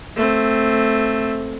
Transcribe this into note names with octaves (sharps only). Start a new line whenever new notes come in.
A3 C4